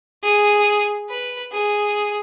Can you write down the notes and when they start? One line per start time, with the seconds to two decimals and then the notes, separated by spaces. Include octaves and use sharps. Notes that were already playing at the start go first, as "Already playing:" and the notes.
0.23 G#4
1.09 B4
1.52 G#4